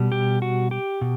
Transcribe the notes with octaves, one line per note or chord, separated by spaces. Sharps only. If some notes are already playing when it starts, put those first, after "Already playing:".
Already playing: B2 G3
G4
F#4
G4
B2